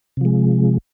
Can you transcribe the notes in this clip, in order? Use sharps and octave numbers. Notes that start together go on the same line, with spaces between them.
C3 F3 G#3